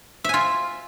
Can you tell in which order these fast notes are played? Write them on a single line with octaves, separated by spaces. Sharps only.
E5 G#5 F4